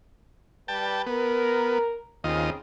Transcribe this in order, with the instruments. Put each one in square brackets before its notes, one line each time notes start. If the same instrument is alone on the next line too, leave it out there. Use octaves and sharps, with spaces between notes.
[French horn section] G3 B4 [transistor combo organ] G5 A5
[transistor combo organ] B3 [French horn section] A#4
[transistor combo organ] D#2 F4 D#5 [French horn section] C#3 C4